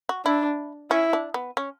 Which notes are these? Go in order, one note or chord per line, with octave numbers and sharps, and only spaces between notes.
F#4
D4 E4
C#4 E4
D4
B3
C#4